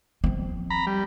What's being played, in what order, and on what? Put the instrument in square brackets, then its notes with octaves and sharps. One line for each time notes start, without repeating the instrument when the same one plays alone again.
[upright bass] F3 C4
[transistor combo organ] A#5 B5
G3